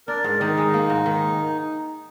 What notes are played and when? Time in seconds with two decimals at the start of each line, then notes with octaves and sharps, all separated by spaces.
0.08 D4 A#4 D5
0.24 G#2
0.40 D#3 D#4
0.58 G#3
0.74 A#3
0.90 G#2
1.06 D#3